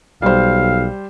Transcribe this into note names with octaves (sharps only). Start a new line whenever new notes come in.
B1 G3 C5 F5